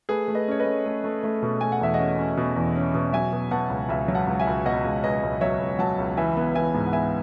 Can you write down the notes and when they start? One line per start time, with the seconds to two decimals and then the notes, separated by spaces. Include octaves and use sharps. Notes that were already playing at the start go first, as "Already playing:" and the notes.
0.09 A3 G#4 B4
0.28 A3
0.35 B4 D#5
0.48 C#4 C#5
0.60 B4 D#5
0.66 A3
0.86 A3
1.04 A3
1.24 A3
1.43 B2
1.61 A3 G#5
1.72 F#5
1.81 E2 E5
1.94 C#4 D#5 F#5
2.18 C#4
2.37 B2
2.56 E2
2.76 C#4
2.94 B2
3.13 F#3 E5 G#5
3.33 B2
3.51 B2 F#5 A5
3.70 C#2
3.89 C#2 E5 G#5
4.08 F#3
4.14 F#5 A5
4.27 C#2
4.40 E5 G#5
4.47 C#2
4.65 B2 D#5 F#5
4.84 C#2
5.04 C#2 B4 D#5
5.23 C#2
5.41 F#3 C#5 E5
5.60 C#2
5.79 F#3 F#5 A5
5.98 C#2
6.17 E3 E5 G#5
6.37 B3
6.55 E3 E5 G#5
6.75 G#2
6.87 F#5
6.93 B3 E5 G#5